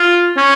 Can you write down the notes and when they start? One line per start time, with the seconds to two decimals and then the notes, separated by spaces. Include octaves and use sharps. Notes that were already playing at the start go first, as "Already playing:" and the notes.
Already playing: F4
0.37 C#4